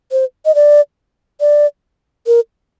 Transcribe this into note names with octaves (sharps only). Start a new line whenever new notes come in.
C5
D#5
D5
D5
A#4